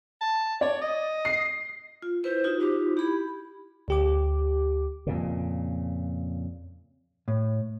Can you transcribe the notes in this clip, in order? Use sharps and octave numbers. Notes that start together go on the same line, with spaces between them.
A5
C#5 D5
D#5
C7
F4
E4 B4 C5
D#4 F4 F#4
G4
E4 G4 B5
D2 G4 D6
F2 A#2 C#3
A2